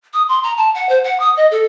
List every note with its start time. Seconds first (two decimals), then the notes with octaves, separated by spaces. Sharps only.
0.14 D#6
0.29 C6
0.43 A#5
0.57 A5
0.74 F#5
0.89 C5
1.04 F#5
1.20 D#6
1.37 D#5
1.51 A4